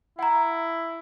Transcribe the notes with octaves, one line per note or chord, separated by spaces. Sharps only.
E4 F#5 A#5